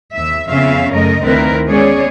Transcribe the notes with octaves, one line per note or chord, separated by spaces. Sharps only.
D#2 E5
F2 C#3 B3 C#4 E5 F5
F#2 A3 A#4 D#5
D2 D#3 C4 E4 A#4 B4
G#3 B3 C#4 G#4 C#5 D5